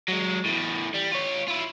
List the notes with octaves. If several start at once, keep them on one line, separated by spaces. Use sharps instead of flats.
F#3 G#3
E2 A2
G3
F4 C#5
E4 F4